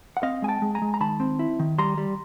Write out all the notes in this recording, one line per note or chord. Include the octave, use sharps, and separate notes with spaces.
F#5
C4 D#5 F5
G#3 G#5
G5 A5
G#3
G#5 A#5
G#3
A#5
D#3 A5 B5
C4
E4
D#3
G3 A#5 C6
G3